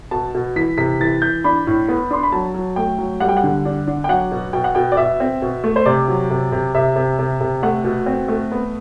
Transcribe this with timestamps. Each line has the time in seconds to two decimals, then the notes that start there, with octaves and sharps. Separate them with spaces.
0.11 B2 A5
0.34 B2
0.56 E3 B6
0.78 C3 B6
1.00 E3 A6
1.22 E3 G6
1.44 D4 B5
1.67 A2
1.89 B3
2.11 D4 C6
2.23 B5
2.32 F#3 A5
2.54 F#3
2.76 A3 G5
2.98 F#3
3.20 G3 F#5
3.29 G5
3.37 F#5
3.44 D3
3.65 D4
3.88 D4
4.04 G5
4.09 F#3 F#5
4.32 B2
4.53 B2 G5
4.64 F#5
4.75 B2 G5
4.92 D5
4.97 B2 E5
5.20 C4
5.42 B2
5.64 A3
5.76 C5
5.86 C3 D5
6.08 F#3
6.30 C3
6.52 C3
6.74 C3 E5
6.96 C3
7.19 C3
7.41 C3
7.63 A3 F#5
7.84 B2
8.06 C4
8.28 A3
8.52 B3